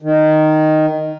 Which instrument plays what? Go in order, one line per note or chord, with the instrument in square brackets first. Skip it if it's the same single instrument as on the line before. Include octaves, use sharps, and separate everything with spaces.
[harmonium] D#3